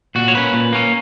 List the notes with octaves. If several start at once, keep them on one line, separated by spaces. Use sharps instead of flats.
A#2 F#4
C#5
A#3 C#4 B4
A#2
A#3 C#4